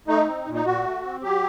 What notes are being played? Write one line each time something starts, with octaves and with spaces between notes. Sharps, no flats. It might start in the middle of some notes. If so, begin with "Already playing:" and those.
A3 D#4
C4
A#2
D#4
A#2 F#4
A3
C4
F#3 G4